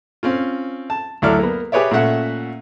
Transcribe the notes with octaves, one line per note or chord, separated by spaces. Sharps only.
C4 C#4 F4
A5
D2 F#3 E4 A4 D5 F6
A#3 B3
G4 G#4 B4 C#5 D5 E5
A#2 A3 C#4 E5 F#5